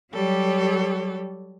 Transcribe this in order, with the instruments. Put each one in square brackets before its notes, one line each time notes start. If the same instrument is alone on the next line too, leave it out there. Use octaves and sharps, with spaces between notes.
[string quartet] F#3 G3 G4 A4 C#5